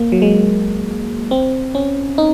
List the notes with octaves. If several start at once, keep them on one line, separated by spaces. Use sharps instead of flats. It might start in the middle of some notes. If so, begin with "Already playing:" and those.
Already playing: A#3
F#3
G#3
C4
C#4
D#4